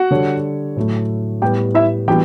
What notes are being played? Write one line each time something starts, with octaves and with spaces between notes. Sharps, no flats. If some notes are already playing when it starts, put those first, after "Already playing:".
Already playing: F#4 F#5
D3 G3 D4 A4 C#5
A2 F#3 A3
A2 G3 B3 G4 G5
E4 E5
E3 G3 B3 D4 F#4 G4 G5